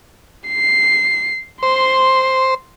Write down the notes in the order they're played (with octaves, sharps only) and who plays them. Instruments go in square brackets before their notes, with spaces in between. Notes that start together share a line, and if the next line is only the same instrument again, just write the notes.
[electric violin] C7
[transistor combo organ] C5 [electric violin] C6